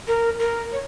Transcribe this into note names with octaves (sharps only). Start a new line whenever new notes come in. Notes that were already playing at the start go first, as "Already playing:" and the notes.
A#4
A#4
C#5